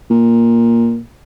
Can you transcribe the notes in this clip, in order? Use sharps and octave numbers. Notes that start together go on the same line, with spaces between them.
A#2